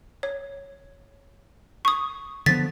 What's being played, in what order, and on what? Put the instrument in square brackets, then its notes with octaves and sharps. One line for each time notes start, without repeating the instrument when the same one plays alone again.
[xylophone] C#5
C#6 D#6
[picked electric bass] D3 F3 B3 [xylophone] A6 B6